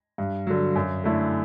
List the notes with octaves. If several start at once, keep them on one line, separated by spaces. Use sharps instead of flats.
G2
D3 F#3
F#2
D3 A3 E4